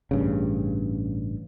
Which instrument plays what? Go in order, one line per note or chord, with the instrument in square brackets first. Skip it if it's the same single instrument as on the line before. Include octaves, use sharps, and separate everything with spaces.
[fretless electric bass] A1 G2 C#3